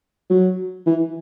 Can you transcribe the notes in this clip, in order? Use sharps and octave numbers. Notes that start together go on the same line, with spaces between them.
F#3
E3